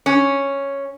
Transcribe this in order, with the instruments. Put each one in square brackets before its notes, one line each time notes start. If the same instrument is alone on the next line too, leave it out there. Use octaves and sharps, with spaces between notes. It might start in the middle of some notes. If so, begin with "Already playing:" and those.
[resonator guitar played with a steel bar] C#4